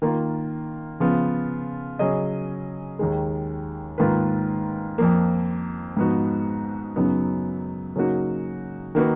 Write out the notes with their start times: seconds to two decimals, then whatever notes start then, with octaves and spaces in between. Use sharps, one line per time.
0.02 D#3 A#3 F4
1.00 C#3 F3 B3 F4
1.99 C#3 F#3 C#4 G#4 D#5
2.99 D#2 D#3 G#3
3.98 G#2 D#3 A#3 F4 B4
4.98 F2 F3 A#3
5.97 G#2 F3 B3 D#4 F#4
6.96 F#2 C#3 F#3 B3 D#4
7.96 C#3 F#3 A#3 D#4 F#4
8.95 D#3 A#3 D#4 F#4 B4